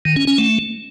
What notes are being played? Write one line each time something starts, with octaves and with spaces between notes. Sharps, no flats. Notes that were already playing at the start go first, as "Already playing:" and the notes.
D#3
C#4
C#4
A3